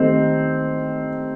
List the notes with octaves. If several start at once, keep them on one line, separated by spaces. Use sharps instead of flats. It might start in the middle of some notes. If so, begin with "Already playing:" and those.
Already playing: D#3 A3 C4 D#4 G4